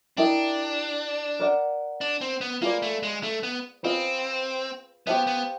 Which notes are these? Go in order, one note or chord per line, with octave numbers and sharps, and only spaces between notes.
D4 E4 G4 A#4 D#5
A#4 D5 F#5
D4
C4
B3
A#3 F4 G#4 B4 D5
A3
G#3
A3
B3
C4 F4 G#4 B4 D#5
B3 G4 C5 F5 A5
B3